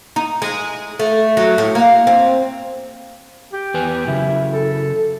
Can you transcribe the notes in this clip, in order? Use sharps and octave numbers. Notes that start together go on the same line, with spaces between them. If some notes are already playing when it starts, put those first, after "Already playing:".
D#4
G#3
A3
F#3
A2
A#3
C4
G4
E2 B4 G#5
C#3 F#3 E4
A4